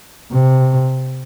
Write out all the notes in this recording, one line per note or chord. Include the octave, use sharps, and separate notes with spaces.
C3